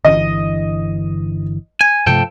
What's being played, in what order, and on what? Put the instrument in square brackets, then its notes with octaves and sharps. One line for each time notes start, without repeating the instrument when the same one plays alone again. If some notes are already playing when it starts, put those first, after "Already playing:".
[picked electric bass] G1 D3 E3 [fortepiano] D#5
[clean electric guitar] G#5
[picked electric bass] G2 C3 A3 [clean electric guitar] F3 A4 G5